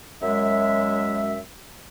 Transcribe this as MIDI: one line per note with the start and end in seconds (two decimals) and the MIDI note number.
0.23 1.39 42
0.23 1.39 56
0.23 1.39 76